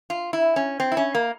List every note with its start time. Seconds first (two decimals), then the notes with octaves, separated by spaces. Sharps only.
0.10 F4
0.33 E4
0.56 C#4
0.80 C4
0.92 E4
0.97 C#4
1.15 A#3